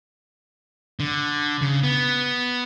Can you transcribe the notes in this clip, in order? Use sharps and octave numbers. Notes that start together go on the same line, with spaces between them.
D3
C#3
B3